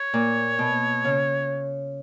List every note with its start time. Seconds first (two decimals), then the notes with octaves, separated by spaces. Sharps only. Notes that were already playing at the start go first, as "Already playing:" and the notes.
Already playing: C#5
0.14 A#2
0.59 B2
1.04 C#3